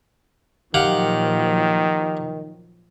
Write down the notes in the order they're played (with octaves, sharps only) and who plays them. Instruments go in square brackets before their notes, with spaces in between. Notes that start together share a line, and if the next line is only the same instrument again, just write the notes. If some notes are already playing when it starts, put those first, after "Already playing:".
[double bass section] A#2 F3 F#3 [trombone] D#3 [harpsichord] G4 F5 F#5